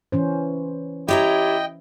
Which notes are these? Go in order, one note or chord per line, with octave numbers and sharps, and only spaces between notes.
E3 C#4 C5
E4 G4 C#5 D#5 G5 A#5